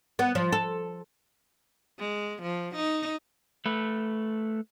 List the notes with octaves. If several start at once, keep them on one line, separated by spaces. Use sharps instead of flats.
B3
F3
A4
G#3
F3
D#4
A3 B4